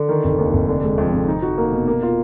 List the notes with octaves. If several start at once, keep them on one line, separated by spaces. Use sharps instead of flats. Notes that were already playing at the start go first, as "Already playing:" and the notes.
Already playing: D3
D#3
F1
D#2
F1
D3
G#3
F2
F1
D#4
F#4
A#3
B2
A#3
F4